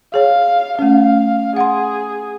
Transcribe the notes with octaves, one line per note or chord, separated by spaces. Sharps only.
G#4 C#5 F5
A3 C#4 F5
G#4 F#5 C6